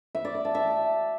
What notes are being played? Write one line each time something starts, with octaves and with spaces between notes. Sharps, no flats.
E5
D5
D5
A5
E5